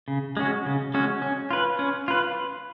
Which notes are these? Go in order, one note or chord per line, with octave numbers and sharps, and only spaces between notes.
C#3
G#3 C#4 F#4
C#3
G#3 C#4 F#4
C#4
F4 B4
C#4
F4 B4